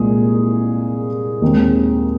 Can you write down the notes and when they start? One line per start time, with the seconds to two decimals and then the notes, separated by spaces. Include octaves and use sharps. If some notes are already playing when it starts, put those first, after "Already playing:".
Already playing: C2 A#2 G#3 G#4
1.42 D#2 D#3 G#3 C4